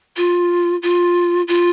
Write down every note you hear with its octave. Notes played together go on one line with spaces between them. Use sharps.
F4
F4
F4